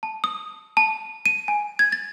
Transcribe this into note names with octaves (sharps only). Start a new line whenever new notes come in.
A5
D#6
A5
D#7
G#5
G#6
A6